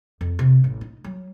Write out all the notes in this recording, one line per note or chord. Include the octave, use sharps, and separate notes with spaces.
F2
C3
A1
D#4
F#3